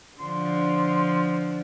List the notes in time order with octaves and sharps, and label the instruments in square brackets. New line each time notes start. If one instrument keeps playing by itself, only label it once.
[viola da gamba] D3 F3 [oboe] C6